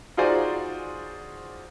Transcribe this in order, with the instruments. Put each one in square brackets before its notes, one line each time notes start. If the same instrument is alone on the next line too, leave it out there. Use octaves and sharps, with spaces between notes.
[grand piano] D#4 F4 F#4 G#4 C5 D5